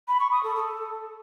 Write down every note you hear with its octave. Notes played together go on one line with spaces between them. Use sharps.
B5
C#6
D#6
A4
A4